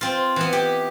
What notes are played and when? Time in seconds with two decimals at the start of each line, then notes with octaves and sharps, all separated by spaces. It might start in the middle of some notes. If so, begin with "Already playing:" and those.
0.01 C4 F4
0.36 E3 B3
0.53 G4